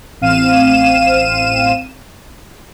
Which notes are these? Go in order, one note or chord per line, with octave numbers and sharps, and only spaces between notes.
A1 C4 F5 D#7 E7